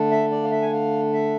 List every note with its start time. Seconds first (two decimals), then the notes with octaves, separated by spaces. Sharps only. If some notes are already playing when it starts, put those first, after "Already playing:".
Already playing: D3 A3 D4
0.11 E5
0.31 D5
0.43 F5
0.51 E5
0.62 G#5
0.72 F5
1.13 E5